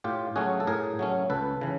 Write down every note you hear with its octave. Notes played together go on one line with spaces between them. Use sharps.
A2 F4 G4
F#3 A3 C#4 F#4 G#4
A4
A2 G#4 A#4
F#3 A3 C#4
C#2 A4 B4
C#3 E3